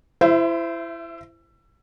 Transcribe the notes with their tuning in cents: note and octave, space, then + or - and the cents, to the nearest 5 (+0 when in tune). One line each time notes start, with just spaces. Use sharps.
E4 +25 C5 -20 E5 +0